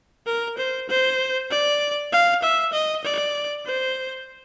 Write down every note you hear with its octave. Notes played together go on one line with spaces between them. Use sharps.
A#4
C5
C5
D5
F5
E5
D#5
D5
C5